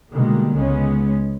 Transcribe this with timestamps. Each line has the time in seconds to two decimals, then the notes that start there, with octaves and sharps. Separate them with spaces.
0.11 B2 D3 D#3 G3 G#3 A#3
0.53 C#2 G#3 B3 C#4